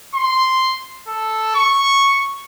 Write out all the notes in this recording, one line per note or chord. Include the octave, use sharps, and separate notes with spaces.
C6
A4
C#6